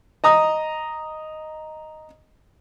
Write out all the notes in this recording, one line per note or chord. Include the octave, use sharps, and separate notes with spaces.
D#5 A#5 D#6